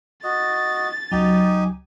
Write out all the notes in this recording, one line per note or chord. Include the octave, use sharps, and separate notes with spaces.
F#4 D#5 A6
C#2 F#3 D#4 G4 G#5